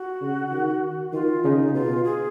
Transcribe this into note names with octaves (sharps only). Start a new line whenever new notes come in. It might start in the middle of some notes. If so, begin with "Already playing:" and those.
Already playing: F#4
C#3
D#3
D#3 F4
C#3 D#4
B2 F4
G#4